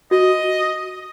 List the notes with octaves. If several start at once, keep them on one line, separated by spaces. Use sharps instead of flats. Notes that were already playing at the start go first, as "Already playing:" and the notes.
F#4 D#5